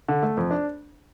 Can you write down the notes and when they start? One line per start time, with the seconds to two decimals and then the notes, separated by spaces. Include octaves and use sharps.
0.08 D3
0.23 A3
0.37 F2
0.51 D4